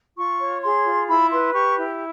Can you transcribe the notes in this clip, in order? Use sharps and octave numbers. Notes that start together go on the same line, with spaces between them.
F4 C#6
C#5
G#4 C6
F4
E4 B5
B4 C6
G4 C#6
E4